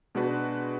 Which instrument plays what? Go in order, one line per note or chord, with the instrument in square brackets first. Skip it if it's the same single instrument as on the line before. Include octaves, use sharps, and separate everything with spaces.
[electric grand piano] B2 G#3 D4 F#4 B4